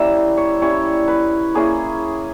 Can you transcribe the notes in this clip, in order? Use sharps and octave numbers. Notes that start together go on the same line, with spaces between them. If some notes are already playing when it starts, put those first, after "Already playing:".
Already playing: G3 A#3 C#4 E4 E5
C#5
G3 C#4 E4 C#5
B4
A#3 C#4 E4 G#4